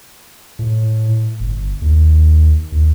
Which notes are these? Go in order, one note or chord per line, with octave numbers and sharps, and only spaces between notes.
A2
G1
D#2
D#2